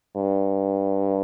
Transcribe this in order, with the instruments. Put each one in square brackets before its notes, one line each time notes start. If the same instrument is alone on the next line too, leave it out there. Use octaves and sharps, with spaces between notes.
[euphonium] G2